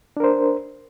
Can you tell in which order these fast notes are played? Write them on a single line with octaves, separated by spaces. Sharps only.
D4 A#4 C5